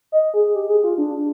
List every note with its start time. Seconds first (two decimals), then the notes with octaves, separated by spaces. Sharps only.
0.12 D#5
0.34 G#4
0.55 G4
0.69 G#4
0.84 F4
0.98 D4